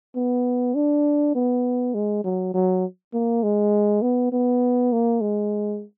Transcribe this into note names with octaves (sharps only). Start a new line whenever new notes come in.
B3
D4
B3
G#3
F#3
F#3
A#3
G#3
B3
B3
A#3
G#3